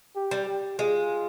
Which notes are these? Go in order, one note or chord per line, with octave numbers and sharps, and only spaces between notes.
G4
G3
G4
G#3 F4